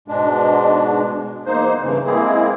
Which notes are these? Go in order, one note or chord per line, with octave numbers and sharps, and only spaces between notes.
G#2 B2 G#3 D4
E2 A#3 D#4 C5
G2 C#3 E3
G#3 A#3 C4 E4 G#4